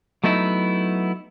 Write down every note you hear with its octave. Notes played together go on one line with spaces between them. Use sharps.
F#3 A3 B3 D#4 E4